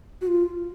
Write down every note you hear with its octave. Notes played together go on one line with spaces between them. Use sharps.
F#4
F4